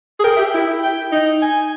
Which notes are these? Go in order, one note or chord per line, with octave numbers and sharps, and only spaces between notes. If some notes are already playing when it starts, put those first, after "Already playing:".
G#4
A#4 G5
G4 E5
G5
E4
G5
D#4
G#5